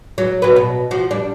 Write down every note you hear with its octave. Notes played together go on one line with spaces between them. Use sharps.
F#3
F#3 B4
B2
F3 F#4
G3 D4